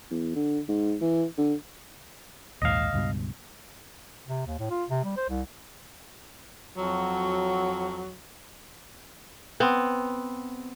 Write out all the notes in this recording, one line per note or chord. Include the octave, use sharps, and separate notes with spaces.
E2
D3
G#2
E3
D3
A#1 D#2 G#2 D#5 F5
C#2 G2 B2
C3
D#2
A2
F4
C3
G3
C5
C2
F2 F#3
B3 C4